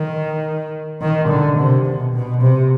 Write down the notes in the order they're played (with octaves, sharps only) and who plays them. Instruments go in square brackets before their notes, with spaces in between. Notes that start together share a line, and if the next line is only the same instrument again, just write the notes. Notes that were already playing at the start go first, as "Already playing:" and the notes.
Already playing: [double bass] D#3
D#3
D3
C3
B2
B2
C3